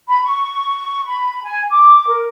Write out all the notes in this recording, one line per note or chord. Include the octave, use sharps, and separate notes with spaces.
B5
C#6
B5
G#5
D6
A#4